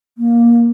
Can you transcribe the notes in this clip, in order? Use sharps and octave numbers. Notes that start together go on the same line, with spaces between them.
A#3